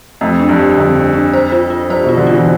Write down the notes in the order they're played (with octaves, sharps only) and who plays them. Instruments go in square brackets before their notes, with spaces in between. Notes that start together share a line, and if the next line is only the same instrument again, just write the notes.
[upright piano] F2 [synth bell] A3
[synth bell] D4
[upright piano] G2
[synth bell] D4
[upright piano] F2 [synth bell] D3
[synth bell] D4
D4
C5
F4
F4
[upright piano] G2 [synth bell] C5
[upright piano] B2 [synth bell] F4
[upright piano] D3
[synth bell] F4
[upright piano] E3